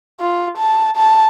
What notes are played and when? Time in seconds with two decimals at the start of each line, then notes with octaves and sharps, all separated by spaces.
0.21 F4
0.58 A5
0.96 A5